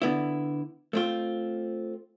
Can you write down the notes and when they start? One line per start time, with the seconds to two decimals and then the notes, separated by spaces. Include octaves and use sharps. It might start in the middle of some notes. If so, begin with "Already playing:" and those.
0.02 D3 B3 E4
0.93 A3 C4 F4